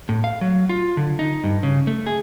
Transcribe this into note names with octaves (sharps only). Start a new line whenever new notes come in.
A2
F5
F#3
F4
D3
D#4
G2
C#3
A3
G#4